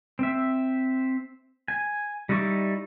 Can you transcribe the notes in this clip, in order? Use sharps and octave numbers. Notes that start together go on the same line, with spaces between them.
C4 E5
G#5
G3 D#4 E4 D5 C#6